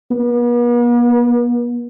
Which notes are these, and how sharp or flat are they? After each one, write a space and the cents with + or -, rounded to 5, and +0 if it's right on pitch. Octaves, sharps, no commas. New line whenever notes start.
B3 -45